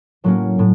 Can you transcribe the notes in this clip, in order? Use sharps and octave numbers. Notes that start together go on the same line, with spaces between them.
A2 F#3 A#3 C#4
A2